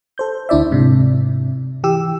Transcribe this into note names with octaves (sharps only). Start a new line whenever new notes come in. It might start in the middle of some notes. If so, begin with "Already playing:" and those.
A4 C5 G6
D2 D4 E4 D5 E5
G#2 C3
E3 G4 E6